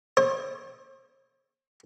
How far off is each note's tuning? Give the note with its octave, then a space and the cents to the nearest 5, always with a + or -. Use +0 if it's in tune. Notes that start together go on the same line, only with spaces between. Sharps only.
C5 +45